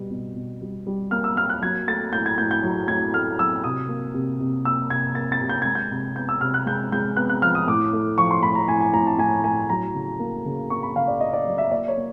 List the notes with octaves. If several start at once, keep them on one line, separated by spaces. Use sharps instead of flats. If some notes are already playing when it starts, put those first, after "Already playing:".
Already playing: B2 G3
B2
B2
G3
G3
A#3 F6
E6
A#3 F6
F#6
F#3 G#6
A3 A6
A2 G6
G#6
A2 G6
G6
F#3
A2 G#6
A3 F6
F#3 E6
C3 D#6
A#3
C3
C3
A#3 E6
C3 G#6
A#3 A6
A6
C3
G6
G#3 G#6
G6
C3
B3 G6
E6
C3 F6
F#6
G#3 G6
G#3 G6
B3 F#6
F#6
F3 F6
D#6
A2 D6
A3
F3 C#6
C6
A2 B5
A#5
A2 G#5
G#5
A2 A#5
A5
A2 G#5
A2 G#5
F#3 A#5
C#3
A#3
C#3
A#3 C#6
B5
C#3 F5
D5
A#3 D#5
D5
F#3
E5
A#3 D5
C#5
A#3